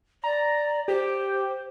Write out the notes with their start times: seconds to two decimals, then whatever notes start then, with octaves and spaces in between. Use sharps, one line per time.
0.24 D5 A#5
0.88 G4 C5